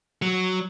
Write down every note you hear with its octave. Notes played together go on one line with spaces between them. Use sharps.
F#3